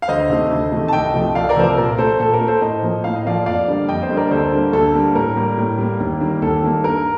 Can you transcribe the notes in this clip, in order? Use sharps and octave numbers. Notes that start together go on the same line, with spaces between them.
F5
D2 C5 D#5
C3 D#3 A3
D2
C3 D#3 A3
A5
C2 D#5 G5
C3 F3 A3
C2 D5 F5
A#4 D5
C3 F3 A3 C5
A#4
A#2 A#4
A3 A4 C5
A#2 A4
A#4
A3
A4 C5
A2 C5 D#5
F3 A#3
A2 F5
D#5
F3 A#3 D5 F5
F2 D5 F5
D3 G3 A#3
F2 D#5 G5
C5 D#5
D3 G3 A#3
A#4 D5
D2 A4 C5
D3 G3 A#3
D2 A4
D3 G3 A#3
A2 A#4
G3 A#3
A2
G3 A#3
D#2
D#3 G3 A#3
D#2 A4
D#3 G3 A#3
G2 A#4